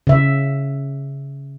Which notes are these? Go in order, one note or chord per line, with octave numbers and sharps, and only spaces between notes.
C#3 E5